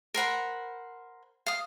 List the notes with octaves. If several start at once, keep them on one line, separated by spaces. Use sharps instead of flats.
A#4 C5 F#5 B5
F5 D#6